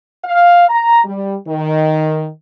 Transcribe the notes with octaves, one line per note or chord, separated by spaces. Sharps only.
F5
A#5
G3
D#3